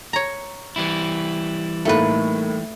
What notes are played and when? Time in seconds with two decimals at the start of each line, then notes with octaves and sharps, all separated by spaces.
0.13 C#5 A#5
0.76 E3 G3 E4
1.85 A2 A3 A#3 D#4 B4